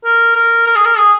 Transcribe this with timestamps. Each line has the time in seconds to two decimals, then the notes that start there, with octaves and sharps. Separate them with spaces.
0.05 A#4
0.36 A#4
0.67 A#4
0.76 G#4
0.85 A#4
0.97 G#4